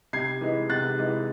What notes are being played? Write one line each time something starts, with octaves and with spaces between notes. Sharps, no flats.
C3 G#6 C7
E3 G#3 D#4
C3 F#6 A6
E3 G#3 D#4